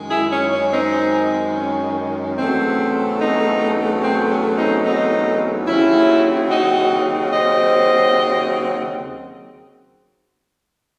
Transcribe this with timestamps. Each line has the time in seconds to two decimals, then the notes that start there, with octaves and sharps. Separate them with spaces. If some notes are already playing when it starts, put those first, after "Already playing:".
Already playing: F#2 D#3 G#3
0.11 E4 G#4
0.32 C#4
0.53 C#4
0.73 C4 D#4
1.56 C#4
2.38 E2 C#3 F#3 A3 C4
3.21 C4 D#4
4.03 C4
4.31 C#4
4.58 C4 D#4
4.86 C4 D#4
5.68 D#2 C#3 F#3 C4 C#4 E4
6.51 D#4 F#4
7.33 C5 D#5